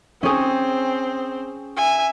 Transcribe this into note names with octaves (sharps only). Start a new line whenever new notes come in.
C4 C#4 G#4
E5 G#5